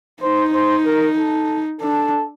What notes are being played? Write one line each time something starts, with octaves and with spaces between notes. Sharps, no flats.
D#4 C5
C5
A#4
A4
D4 A4